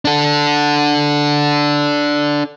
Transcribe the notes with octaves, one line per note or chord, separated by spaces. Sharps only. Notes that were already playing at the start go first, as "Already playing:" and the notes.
D4 A4